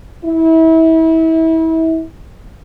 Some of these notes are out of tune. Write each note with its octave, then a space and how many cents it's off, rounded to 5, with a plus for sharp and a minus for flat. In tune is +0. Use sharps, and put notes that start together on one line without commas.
E4 -30